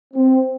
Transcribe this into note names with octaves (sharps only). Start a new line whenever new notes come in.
C4